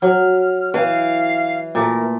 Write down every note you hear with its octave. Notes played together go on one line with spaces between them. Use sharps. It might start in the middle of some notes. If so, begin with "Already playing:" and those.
F#3 F6
E3 F5
A#2 A3 A#4